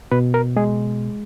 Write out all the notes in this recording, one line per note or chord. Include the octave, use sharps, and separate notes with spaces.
B2 B4
A#4
G#3 G#4